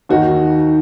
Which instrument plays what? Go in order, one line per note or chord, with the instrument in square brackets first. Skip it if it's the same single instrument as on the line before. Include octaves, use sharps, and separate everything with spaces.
[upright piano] D#2 D#3 D#4 F#4